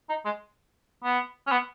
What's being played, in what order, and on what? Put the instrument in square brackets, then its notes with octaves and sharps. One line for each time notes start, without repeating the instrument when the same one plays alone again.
[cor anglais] D#4
G#3
B3
C#4
B3